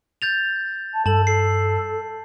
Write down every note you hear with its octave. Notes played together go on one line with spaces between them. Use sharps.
G6 A6 F7
A5
G2 A4 A5 F#7
A4 C7